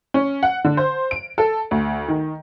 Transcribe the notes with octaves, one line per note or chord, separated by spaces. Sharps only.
C#4
F#5
D3
C5
D7
A4
D2
D#3